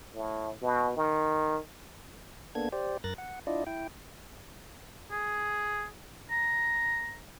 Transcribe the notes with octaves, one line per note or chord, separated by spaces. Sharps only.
A2
B2
D#3
A#3 B3 D4 A4 G#6
G4 C5 D5
F#2 A#4 F#6 A6 A#6
F#5
D4 E4 F4 D5 D#5
E4 G5
G#4
A#5